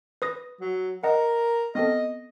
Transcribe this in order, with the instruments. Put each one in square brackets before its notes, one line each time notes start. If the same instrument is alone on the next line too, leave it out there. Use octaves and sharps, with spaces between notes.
[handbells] B4 D#6 A#6
[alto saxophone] F#3
[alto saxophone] A#4 [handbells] D#5 F#5
[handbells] B3 C4 A4 [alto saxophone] D#5